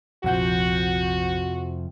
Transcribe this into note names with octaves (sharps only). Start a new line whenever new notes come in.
A#1 F2 C3 F3 F#4 F#5 G6